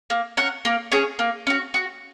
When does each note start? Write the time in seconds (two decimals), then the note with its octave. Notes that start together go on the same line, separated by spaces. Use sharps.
0.10 A#3
0.37 C#4 A#4 F#5
0.65 A#3
0.92 C#4 G#4 C#5
1.19 A#3
1.47 C#4 F#4
1.74 F#4